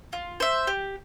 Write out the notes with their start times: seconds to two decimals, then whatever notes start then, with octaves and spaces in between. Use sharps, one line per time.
0.13 F4
0.40 C5 E5
0.67 G4